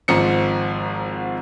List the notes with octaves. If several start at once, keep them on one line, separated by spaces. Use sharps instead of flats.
G#1 G#2 F3 C#7